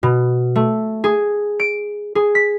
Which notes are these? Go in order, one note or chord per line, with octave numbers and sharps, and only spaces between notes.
B2
A3
G#4
D7
G#4
B6